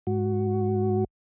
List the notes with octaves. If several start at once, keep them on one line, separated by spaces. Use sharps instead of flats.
G#2 F#4